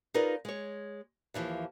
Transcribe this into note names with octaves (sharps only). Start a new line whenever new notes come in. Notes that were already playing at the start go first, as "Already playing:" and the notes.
D#4 F4 G#4 A#4 B4 D5
G#3 C#5
D#2 E3 F3 E4